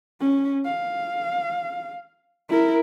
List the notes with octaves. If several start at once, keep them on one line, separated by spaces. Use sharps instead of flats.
C#4
F5
E4 A#4